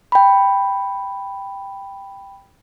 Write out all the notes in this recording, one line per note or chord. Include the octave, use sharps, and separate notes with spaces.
G5 B5